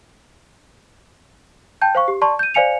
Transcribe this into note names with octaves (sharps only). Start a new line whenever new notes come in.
G5 A5 G6
C5 F5 C#6
G4
D5 A5 C6 C#6
G6 D#7
C5 D5 F5 G#5 C#7 F7